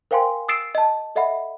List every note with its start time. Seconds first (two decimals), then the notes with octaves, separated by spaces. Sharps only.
0.11 A#4 C5 F5 G5 G#5 C6
0.48 D#6 E6 A6 C7 D7 E7
0.75 D#5 A5
1.16 A4 D#5 E5 F#5 B5